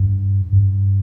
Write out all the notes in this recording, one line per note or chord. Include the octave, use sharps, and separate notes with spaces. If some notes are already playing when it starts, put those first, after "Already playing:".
Already playing: G2
G2